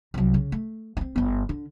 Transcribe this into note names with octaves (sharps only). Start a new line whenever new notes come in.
C2 F#3
C#3
A3
C4 C#4
G1 B3
D3